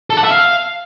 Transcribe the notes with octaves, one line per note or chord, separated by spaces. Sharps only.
A4
F#5
E5
F5